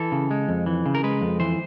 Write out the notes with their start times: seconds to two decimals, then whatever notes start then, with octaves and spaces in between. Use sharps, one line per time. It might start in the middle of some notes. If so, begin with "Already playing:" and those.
Already playing: E3 A4
0.12 C#3
0.31 G#3
0.49 F2
0.66 E3
0.86 C#3
0.95 A#4
1.04 G#3 B4
1.21 F2
1.40 E3 C5